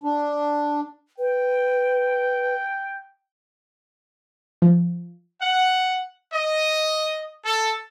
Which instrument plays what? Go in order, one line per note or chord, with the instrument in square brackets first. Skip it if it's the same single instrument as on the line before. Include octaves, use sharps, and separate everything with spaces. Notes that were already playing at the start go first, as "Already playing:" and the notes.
[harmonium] D4
[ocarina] B4 [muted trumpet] G5
[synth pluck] F3
[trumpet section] F#5
D#5
A4